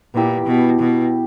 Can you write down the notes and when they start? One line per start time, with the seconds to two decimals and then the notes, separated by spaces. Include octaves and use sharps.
0.14 A#2 B3 E4 G4
0.46 B2
0.80 B2